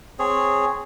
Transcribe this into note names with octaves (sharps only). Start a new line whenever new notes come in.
C4 G#4 C#5